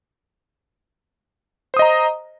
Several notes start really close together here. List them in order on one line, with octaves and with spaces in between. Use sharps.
C5 D#6 D#5 A#5